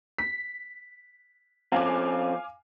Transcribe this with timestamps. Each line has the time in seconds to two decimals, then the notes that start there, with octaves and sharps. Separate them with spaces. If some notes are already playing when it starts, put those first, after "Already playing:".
0.18 B6
1.72 F3 C4 C#4 F5 G#5 D6